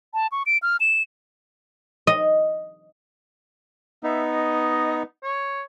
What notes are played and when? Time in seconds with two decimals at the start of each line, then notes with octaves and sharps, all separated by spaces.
0.14 A5
0.32 C#6
0.46 D7
0.62 F6
0.80 E7
2.07 D#5
4.03 B3 D#4 E5
4.31 D#5
5.23 C#5